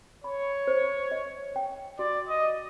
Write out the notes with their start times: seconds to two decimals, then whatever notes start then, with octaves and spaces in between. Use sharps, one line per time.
0.24 C#5 B5
0.67 C5
1.11 D#5
1.56 G5
1.99 F#4 D5
2.28 D#5
2.43 F#4